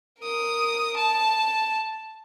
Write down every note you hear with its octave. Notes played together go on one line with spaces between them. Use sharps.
A#4 D#6
A5